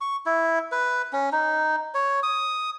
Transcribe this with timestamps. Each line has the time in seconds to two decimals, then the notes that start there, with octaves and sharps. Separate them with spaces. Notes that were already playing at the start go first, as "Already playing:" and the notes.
0.01 C#6
0.26 E4
0.72 B4
1.13 C#4
1.32 D#4
1.94 C#5
2.23 D#6